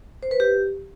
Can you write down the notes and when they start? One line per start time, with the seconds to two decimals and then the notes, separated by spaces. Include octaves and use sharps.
0.23 C5
0.31 B4
0.40 G4